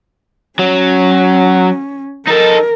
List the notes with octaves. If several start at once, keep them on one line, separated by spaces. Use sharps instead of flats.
F#3 C#4
D#4 A4 A#4